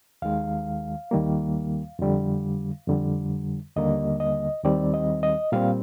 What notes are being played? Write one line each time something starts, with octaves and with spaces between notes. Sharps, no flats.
D#2 D#3 G#3 F5
D#2 D#3 G3 A#3
F2 D3 G3
F2 D3 G3
D#2 D3 G3 A#3 D#5
D#5
D#2 D#3 G3 C4 D5
D#5
D#5
A#2 G3 C4 F5